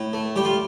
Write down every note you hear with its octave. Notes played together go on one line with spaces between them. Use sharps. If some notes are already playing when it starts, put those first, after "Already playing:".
Already playing: A2
A3
G3 G4
F4